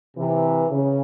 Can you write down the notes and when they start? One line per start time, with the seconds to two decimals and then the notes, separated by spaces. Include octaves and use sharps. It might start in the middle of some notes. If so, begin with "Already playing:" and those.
0.17 C3 E3
0.71 C#3